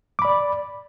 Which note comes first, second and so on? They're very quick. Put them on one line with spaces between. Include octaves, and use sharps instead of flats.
D6 B5 D5